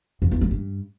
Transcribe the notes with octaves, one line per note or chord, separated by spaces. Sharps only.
F2
E2
A3
G2